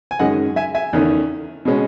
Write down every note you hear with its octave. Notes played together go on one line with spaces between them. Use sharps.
G#5
F#2 D#3 G#3 C#4 D#5 F#5
E5 G#5
E5 G#5
E2 D#3 A3 C#4
B2 G#3 C#4